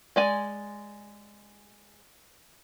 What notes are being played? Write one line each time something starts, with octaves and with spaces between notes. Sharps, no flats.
G#3 D5 G#5